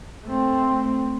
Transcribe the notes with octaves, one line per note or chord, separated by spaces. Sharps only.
A3 C4